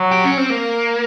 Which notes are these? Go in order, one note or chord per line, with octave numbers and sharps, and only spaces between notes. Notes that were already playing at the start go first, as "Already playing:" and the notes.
Already playing: F#3
G4
C#4
C4
A#3